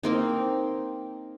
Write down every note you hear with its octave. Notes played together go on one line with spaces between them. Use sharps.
A#3 C4 D#4